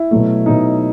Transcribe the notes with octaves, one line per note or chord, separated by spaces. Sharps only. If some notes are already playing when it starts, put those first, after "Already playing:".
Already playing: E4
B2 F#3 A3
B2 F#3 A3 D#4